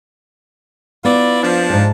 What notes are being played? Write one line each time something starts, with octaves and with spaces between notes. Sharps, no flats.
B3 E4 F4 D5
F3 D4
G#2 A5